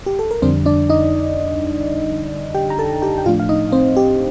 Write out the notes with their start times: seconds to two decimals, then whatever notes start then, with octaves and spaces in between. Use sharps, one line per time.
0.06 G4
0.19 A4
0.31 A#4
0.42 F2 D3 G3 C4 D4 C5
0.66 D4 D5
0.90 D#4 D#5
2.54 G4 G5
2.70 A#5
2.79 A4 A5
3.02 G4 G5
3.18 G5
3.26 A2 F3 A3 D4 F4 F5
3.40 F5
3.49 D#4 D#5
3.72 C4 C5
3.97 G4